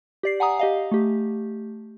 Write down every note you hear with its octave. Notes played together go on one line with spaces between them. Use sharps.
G4 D5 C7
F#5 G#5 A#5 D#6
G4 D#5 F5
A3 G4